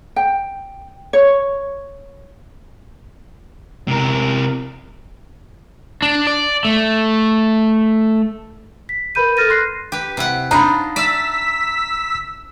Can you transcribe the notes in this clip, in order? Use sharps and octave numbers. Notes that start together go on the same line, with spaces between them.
G5
C#5
C3 A#4
D4
D5
A3
B6
A#4 B4 B5 G6 D#7
A4 F6 A6 A#6 D#7
C6 F#6 A#6 C7
G4 B4
C3 E4 F#5
D4 D#4 F4 A#5 B5
D5 E5 E6 B6